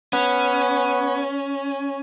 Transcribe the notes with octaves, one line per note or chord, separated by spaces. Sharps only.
B3 C#4